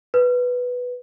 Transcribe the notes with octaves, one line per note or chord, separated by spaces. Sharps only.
B4